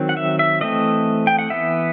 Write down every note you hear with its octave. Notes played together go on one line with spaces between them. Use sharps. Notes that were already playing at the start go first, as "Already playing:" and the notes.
Already playing: D#3 F#3 C4
F#5
E5
E5
E3 A3 C4 D#5
G5
F#5
E3 B3 E5